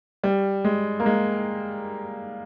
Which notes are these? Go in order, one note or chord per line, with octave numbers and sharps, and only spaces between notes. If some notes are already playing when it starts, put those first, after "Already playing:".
G3
G#3
A#3
G#3